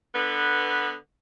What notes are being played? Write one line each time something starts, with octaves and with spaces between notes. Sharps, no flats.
D3 B3